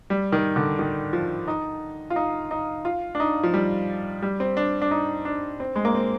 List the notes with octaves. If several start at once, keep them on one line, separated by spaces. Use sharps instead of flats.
G3
D#3
D3
D#3
F3
D#4
F4
D#4
D#4
F4
D4
D#4
F3
G3
G3
C4
D4
D4
D#4
D4
C4
G#3
A#3
C4